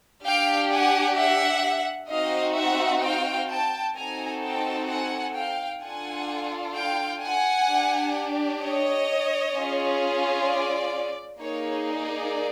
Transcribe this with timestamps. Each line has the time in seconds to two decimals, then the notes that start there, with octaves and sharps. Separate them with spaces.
0.25 D4 G4 F5 G5
0.71 F#5 G#5
1.17 E5 F#5
2.10 C4 D#4 F#4 D#5 F5
2.57 E5 F#5
3.03 F5 G5
3.49 G5 A5
3.96 C4 D#4 F#4 A4 G#5 A#5
4.43 G5 A5
4.89 F#5 G#5
5.35 F5 G5
5.82 D4 F4 A4 F#5 G#5
6.76 F5 G5
7.22 F#5 G#5
7.68 D4 G4
8.61 C#5 D#5
9.54 C#4 F4 G#4
10.47 D5
11.40 A#3 D#4 G#4 C#5
11.87 D5